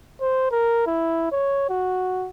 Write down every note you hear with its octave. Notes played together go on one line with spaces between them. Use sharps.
C5
A#4
E4
C#5
F#4